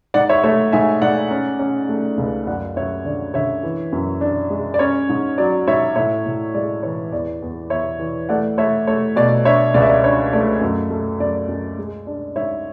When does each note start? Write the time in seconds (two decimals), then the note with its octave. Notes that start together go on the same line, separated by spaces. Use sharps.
0.14 G#2 D5 F#5
0.29 C#5 E5
0.43 A3 C#5 E5
0.72 G#2 E5 G#5
1.02 G#2 D5 F#5
1.31 C#4
1.59 C#4
1.89 A3
2.18 C#2
2.47 F#2 D5 F#5
2.76 F#2 C#5 E5
3.05 D3 D5
3.34 D3 C#5 E5
3.63 E3
3.93 F#2
4.21 D4
4.50 G#3
4.74 D5
4.79 C#4 C#5
5.09 G#2
5.38 F#3 D5
5.68 G#2 C#5 E5
5.96 A2 C#5 E5
6.26 A2
6.54 G#3 D5
6.83 E3 C#5
7.12 E2 D5
7.42 E2
7.70 E2 C#5 E5
7.99 E3
8.29 A3 D5 F#5
8.58 A3 C#5 E5
8.87 A3 C#5
9.16 B2 D5
9.45 D4 C#5 E5
9.74 C#2 D5
9.82 E5
9.89 D5
10.04 D4 C#5
10.33 A3 D5
10.61 F#2
10.90 A3
11.20 F#2 D5
11.48 F#2
11.78 G#3
12.07 D4
12.36 G#2 C#5 E5